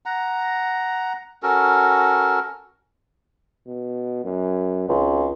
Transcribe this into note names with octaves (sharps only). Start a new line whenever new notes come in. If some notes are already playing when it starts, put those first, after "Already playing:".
F#5 A#5
C#4 F#4 A4 A#4
B2
F#2
G#1 C#2